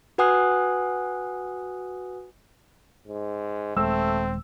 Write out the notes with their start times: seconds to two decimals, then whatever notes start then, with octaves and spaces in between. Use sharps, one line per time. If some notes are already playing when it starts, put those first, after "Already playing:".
0.18 F#4 B4 F#5 G#5 D#6 F#6
3.08 G#2
3.77 D#1 G#3 A3 C4 E6